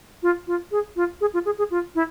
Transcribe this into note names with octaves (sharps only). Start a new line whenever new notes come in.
F4
F4
G#4
F4
G#4
F4
G#4
G#4
F4
E4